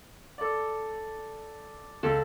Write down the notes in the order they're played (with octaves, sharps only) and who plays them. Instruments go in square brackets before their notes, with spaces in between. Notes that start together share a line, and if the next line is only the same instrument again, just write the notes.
[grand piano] A4 D5
[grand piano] C#2 [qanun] A4